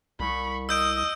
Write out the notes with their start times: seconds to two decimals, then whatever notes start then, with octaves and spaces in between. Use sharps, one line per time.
0.20 C2 B5 C#6
0.69 D#5 E6 G6 D7